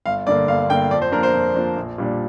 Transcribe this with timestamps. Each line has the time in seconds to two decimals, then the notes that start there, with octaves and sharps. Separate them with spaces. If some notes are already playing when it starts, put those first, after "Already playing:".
0.06 G1 F5
0.27 G2 D3 A#3 D5
0.48 G1 F5
0.69 G2 D3 A#3 G5
0.91 F2 D5
1.02 C5
1.12 F3 A#3 D4 A#4
1.23 C5
1.34 F2
1.55 F3 A#3 D4
1.77 A#1
1.98 A#2 G3 D4